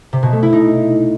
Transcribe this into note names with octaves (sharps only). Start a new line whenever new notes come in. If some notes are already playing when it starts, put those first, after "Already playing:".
C3
B2
A3
E4
D#4